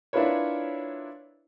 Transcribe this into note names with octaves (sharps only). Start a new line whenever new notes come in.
D4 E4 F4 A#4 B4 C#5